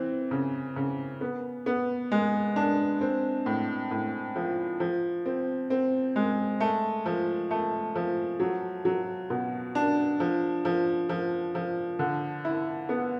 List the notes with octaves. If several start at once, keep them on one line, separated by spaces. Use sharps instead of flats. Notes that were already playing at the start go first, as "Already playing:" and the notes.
Already playing: E3 C4
C#3
C#3
B3
B3
G#3
D4
C4
A2
A2
F3
F3
C4
C4
G#3
A3
F3
A3
F3
F#3
F#3
B2
D4
F3
F3
F3
F3
D3
E4
B3